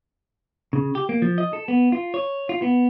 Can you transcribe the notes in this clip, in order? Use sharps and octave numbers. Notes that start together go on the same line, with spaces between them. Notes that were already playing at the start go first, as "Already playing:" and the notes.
C#3
G4
A#3
F3
D#5
A4
B3
F4
C#5
F4
B3